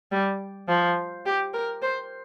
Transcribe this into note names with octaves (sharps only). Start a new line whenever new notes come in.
G3
F3
G4
A#4
C5